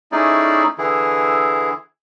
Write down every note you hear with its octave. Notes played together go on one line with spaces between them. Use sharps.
A3 C#4 D#4 E4 G#4 D5
D3 E3 E4 G#4